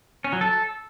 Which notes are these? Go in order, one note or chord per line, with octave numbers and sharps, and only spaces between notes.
C#4
F#3
A4